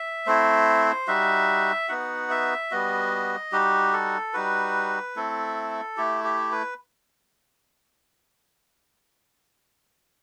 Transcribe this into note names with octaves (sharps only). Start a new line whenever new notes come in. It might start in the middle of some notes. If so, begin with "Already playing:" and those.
Already playing: E5
A3 C4 E4 C5
G3 D#4 F#4 E5
B3 D#4 F#4 F#5
E5
G3 B3 F#4 D#5
G3 D#4 F#4 G4
A4
G3 D#4 F#4 B4
A3 C4 E4 A4
A3 E4 G4
G4
B4